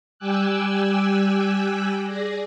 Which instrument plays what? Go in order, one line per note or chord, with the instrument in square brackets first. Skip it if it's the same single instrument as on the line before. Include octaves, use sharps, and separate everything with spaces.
[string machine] G3 G5 G#5 D6 E6 F#6
G#4 D5 A#6